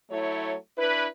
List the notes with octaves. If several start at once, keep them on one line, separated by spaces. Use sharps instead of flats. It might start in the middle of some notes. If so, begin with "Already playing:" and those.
F#3 A3 E4 C#5
D4 E4 B4